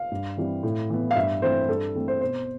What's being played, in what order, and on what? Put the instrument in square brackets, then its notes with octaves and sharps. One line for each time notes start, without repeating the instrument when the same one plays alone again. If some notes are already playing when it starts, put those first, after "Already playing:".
Already playing: [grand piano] F5
G2
E3 G3 C4
A2
E3 B3
F5
G2 E5
E3 A3 C4 C5
G2 A4
E3 A3 C4
C5
B2 C5